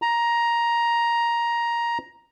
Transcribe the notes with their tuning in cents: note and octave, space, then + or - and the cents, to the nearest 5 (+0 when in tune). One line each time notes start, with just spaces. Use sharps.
A#5 +10